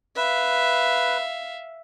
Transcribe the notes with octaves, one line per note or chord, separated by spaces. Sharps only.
B4 E5 F5